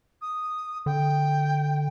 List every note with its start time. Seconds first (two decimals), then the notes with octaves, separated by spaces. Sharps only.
0.21 D#6
0.86 D3 G5